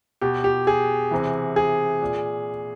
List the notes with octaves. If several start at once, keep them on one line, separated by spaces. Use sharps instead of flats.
B2 G4
G4
G#4
C3 E3
G#4
A#2